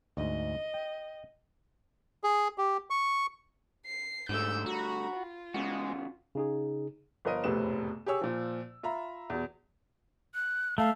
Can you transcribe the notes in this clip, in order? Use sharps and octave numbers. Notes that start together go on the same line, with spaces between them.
D2 G#2 D#5
G5
G#4
G4
C#6
C7
G#2 D3 G3 A3 E6 G6
F#4 A#5 B5
F4
E2 C#3 G#3 F#4
C#3 D#4 G#4
G1 F3 A#4 D#5 D#7
E1 F2 A2 C3 B4 E7
G4 G#4 C#5 E6
A#2 F3
F4 E5 A#5 B5
E2 B2
F#6
A3 F5